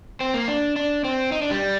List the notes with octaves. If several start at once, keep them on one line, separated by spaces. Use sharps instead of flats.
C4
A#3
D4
D4
C4
D#4
D4
G3